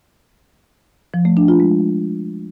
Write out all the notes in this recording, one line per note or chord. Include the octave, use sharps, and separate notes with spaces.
F3
A3
D4
F4
G#3